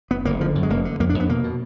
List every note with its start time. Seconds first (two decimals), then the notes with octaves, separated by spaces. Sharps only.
0.11 F#1 B3
0.25 F#1 A#3
0.40 D3 F3
0.55 F#2
0.63 G#3
0.70 F1 A#3
0.85 D3
1.00 F2 A#3
1.10 D4
1.14 F2
1.20 B3
1.29 B2 A#3
1.44 B2